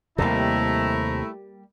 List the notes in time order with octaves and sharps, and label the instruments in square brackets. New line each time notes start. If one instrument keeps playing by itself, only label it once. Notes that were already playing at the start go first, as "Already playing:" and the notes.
[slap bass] D#2 C3 [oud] G3 A#3 [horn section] A3 E4 [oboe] A#5